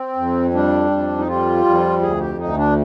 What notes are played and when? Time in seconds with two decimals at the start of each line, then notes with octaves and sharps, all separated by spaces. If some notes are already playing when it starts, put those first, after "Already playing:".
Already playing: C4
0.16 F2
0.54 G3 D4
0.91 F2
1.18 D#4
1.27 G3 F4
1.65 F2
2.01 D2 G#4
2.20 G4
2.38 D2 D#4
2.57 D4